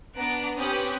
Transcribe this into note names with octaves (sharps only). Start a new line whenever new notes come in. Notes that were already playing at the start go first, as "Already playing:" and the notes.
B3 D4 A#5 F#6 D7
C4 C#4 G4 B4 D#6 F#6